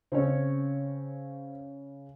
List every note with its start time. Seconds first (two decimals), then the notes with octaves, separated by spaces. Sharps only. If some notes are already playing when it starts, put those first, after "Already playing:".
0.12 C#3 C4 C#4 C#5